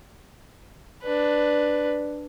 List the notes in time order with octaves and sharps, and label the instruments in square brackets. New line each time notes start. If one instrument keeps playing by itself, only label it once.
[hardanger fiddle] D4 B4